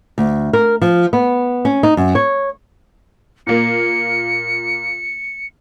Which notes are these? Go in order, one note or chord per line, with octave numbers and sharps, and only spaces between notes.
D2
A#4
F3
B3
C#4
D#4
F#2
C#5
A#2 A#3 C#7